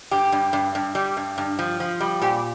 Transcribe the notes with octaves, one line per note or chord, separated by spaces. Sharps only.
G2 G4
G2
G2
G2
G3
G2
G2
F3
F3
G3
A#2 G4